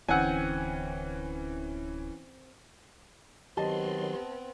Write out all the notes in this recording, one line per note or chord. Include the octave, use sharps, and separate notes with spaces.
D1 D3 E3 C4 C#4 F#5 G#5
D#3 F#3 B3 C4 G4 D#5 A5 C6